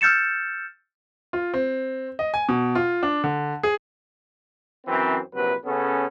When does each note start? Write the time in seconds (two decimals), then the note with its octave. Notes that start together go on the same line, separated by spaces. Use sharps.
0.01 E6 F6 G6 A6 C#7 E7
1.33 F4
1.54 C4
2.19 D#5
2.34 G#5
2.49 B2
2.75 F4
3.03 D4
3.24 D3
3.63 G#4
4.87 F#2 E3 C4
5.34 A#1 C3 F#3 B4
5.65 C#3 B3 C#4 A4